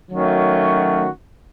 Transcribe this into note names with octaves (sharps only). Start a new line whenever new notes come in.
D#3 F#3 A3 C#4 F#4